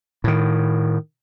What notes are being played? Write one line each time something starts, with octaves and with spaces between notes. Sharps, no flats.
A2 D#3